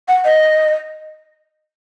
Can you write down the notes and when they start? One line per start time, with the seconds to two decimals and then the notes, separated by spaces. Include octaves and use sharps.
0.08 F#5
0.25 D#5